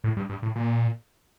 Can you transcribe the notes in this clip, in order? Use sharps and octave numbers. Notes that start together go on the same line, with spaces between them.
A2
G2
G2
A2
A#2